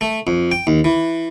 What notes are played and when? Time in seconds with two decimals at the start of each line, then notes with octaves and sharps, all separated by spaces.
0.01 A3
0.27 F2
0.52 G5
0.67 D#2
0.84 E3